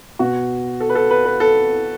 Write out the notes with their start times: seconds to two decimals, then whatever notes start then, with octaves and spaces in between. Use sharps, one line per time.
0.19 B2 F#4
0.80 A4
0.89 B4
0.95 A4
1.11 B4
1.25 B4
1.40 A4